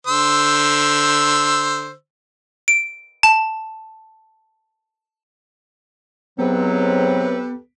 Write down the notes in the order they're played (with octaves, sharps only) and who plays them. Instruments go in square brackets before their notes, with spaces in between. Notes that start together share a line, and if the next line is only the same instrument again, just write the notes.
[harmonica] D3 C5 E6
[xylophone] D7
A5
[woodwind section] G#2 C3 F#3 [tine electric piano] B3 [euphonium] C4 [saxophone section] G4 A4 B4